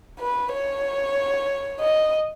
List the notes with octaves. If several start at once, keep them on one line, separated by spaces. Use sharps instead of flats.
B4
C#5
D#5